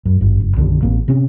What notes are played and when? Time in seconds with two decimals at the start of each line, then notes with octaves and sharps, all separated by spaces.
0.05 F#2
0.21 G#1 G2
0.40 F#1
0.56 B1 F#2 D3 D#3
0.81 A1 A#3 C4
1.08 C3 C4 C#4